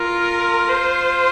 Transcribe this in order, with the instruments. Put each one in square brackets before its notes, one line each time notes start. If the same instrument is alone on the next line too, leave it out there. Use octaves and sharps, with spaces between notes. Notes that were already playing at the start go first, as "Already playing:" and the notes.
Already playing: [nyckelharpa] F4 [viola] A#4
[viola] C5